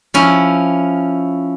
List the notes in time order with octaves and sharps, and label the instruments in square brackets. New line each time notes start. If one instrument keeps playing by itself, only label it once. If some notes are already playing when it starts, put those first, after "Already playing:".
[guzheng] F3 C#4 E4